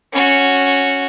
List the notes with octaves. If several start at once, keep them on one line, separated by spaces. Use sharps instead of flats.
C#4 F#4